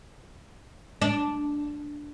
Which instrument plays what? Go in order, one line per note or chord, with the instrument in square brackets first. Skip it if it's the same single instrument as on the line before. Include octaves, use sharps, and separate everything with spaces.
[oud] D4